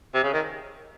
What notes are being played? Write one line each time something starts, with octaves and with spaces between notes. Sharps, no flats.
C3
C#3
D#3